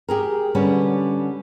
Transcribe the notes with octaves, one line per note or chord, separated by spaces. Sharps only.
G4 G#4 A#4
D3 G3 B3 C#4